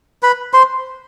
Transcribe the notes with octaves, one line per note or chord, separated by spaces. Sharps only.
B4 B5
C5 C6